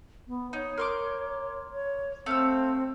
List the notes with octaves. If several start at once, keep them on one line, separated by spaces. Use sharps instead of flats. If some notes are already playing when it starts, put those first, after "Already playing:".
B3
D#4 C#5
A#4 C6 D6
C#5
A3 C4 F5 E6